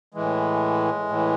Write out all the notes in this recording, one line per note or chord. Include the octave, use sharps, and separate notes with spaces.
A2 E3 G#3
A2 E3